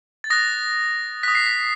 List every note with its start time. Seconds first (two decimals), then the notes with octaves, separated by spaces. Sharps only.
0.24 A6
0.30 D#6 F#6 A#6
1.23 D#6 F#6 B6
1.35 C7
1.46 B6